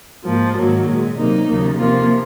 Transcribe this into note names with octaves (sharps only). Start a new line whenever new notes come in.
G#2 F3 A#3
G#2 D#3 F#3 A#3
A#2 G#3
C3 F#3 A#3 D#4
D#2 C#3 F#3 A#3
C3 F3 A#3 F4